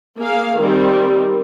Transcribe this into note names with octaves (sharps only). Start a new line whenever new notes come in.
A#3 G#4 F5
D#3 G3 C4